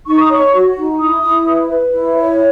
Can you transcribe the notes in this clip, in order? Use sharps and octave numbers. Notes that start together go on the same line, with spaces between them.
D#4 C#6
D#6
C#5 C#6
F#4
D#4
E4 D#6
E4
B4
B4
E4
C#5